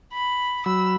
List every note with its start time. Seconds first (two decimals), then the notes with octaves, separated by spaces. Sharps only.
0.13 B5
0.66 F#3 B5 E6